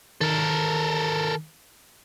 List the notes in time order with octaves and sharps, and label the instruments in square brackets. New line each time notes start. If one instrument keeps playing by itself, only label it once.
[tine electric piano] D#3 [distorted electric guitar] A4 A#4